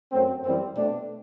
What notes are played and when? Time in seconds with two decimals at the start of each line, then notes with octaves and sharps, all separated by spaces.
0.12 F#2 F#3 A3 C4
0.43 F#2 E3 G3 C4
0.76 B2 A3 C4 D4